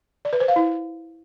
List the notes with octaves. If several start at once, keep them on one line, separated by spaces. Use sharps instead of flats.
D5
B4
C5
F5
E4